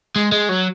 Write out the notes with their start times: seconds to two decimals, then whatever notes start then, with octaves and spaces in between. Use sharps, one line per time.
0.16 G#3
0.32 G#3
0.49 F#3